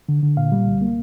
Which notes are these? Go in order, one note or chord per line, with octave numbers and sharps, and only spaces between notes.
D3
D3
A#2 F5
G3
C2
A#3